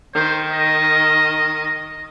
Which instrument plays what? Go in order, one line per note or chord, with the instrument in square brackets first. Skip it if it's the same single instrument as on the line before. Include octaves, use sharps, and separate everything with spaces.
[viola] D#3 [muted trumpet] C5
[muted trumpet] D#5